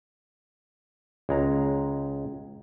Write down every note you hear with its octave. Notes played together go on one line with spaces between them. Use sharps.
C#2 G#3 A#5